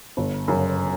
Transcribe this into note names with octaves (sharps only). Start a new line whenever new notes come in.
G1
F#2 C#3